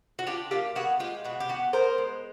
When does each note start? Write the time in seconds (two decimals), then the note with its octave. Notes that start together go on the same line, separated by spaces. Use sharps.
0.19 F#4
0.27 D4 F4 G4
0.51 A#3 F4 G4
0.75 B3 F#4 G#4
1.00 G#3 F4 G4
1.24 B2 F#4
1.40 G4
1.49 B3 F#4
1.73 B3 A#4 C5
1.98 G#3